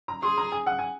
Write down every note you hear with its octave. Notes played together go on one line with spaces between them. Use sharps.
A#5
G#4 C6
A#5
G#5
F#5
G#5